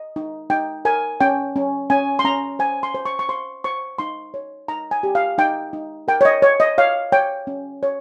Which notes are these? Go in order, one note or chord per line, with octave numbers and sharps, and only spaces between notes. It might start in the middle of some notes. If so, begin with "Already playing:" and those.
Already playing: D#5
D#4
D#4 G5
A#4 G#5
C#4 G5
C#4
C#4 G#5
C6
C#4 A#5
C5 G#5
C6
C5
C#6
C#6
C5 C6
C5 C#6
D#4 C6
C#5
D#4 A#5
G#5
G4
F5
D#4 G5
D#4
A#4 G5
C#5
D#5
C#5
D#5
C#5 F5
C#5 G5
C#4
C#5